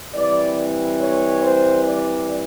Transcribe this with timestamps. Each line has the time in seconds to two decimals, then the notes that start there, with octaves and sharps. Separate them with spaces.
0.13 E3 G3 C4 D5
0.98 C#5
1.41 C5
1.83 D5